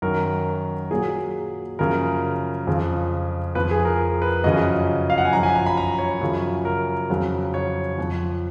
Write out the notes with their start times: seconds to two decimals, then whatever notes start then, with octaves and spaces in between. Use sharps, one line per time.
0.02 F#2 D#3 F#3 A#4
0.91 A#2 F#3 G#4
1.79 F#2 C#3 F3 A#4
2.67 F2 C#3 F3
3.55 F2 F3 B4
3.71 G#4
3.85 A#4
4.22 B4
4.44 F#2 C#3 F3 D#5
5.10 F5
5.18 F#5
5.25 G#5
5.33 F#2 F3 A#5
5.43 G#5
5.55 A#5
5.66 B5
5.77 A#5
5.98 C#5
6.21 F#2 C#3 F3
6.65 A#4
7.10 F2 C#3 F#3
7.54 C#5
7.98 F2 F3